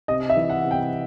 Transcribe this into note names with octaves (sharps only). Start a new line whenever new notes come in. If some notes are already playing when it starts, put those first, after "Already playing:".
C3 D#5
E5
E3
F#5
C3
G5